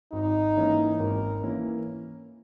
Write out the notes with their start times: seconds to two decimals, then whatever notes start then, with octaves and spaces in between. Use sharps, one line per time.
0.13 G#1 D#4
0.56 G#2 E3 A#3 C#4
0.99 G#1 A#4
1.43 E3 A#3 C#4